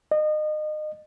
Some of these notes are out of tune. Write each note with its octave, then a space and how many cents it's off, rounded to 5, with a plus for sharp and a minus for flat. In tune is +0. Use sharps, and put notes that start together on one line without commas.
D#5 -30